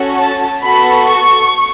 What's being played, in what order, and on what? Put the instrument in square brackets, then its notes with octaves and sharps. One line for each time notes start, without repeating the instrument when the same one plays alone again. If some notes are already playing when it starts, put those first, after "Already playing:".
Already playing: [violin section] C#4 F#4 A4
A5
B3 F#4 A4 B5
C#6